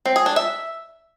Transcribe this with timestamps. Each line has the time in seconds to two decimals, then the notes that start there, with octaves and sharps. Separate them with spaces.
0.05 C4
0.16 G#4
0.26 D4
0.36 E5